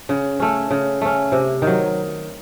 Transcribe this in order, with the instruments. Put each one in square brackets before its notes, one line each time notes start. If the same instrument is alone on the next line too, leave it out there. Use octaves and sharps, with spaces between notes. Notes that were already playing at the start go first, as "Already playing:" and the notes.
[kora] C#3
A3 C#4
C#3
A3 C#4
C3
D#3 F#3